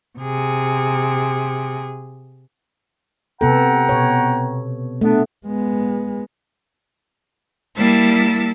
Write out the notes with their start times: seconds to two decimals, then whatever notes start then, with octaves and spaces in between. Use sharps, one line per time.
0.19 C3 G#4
3.41 C3 B3 A4 F#5 G5 A#5
3.89 B2 C#5
5.01 A3 B3 D4
5.46 G#3 B3
7.77 G3 A#3 E4 A5 E6 A6